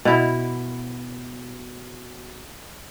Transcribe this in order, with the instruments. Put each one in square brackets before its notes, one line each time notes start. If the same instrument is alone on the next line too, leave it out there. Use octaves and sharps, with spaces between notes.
[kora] B2 E4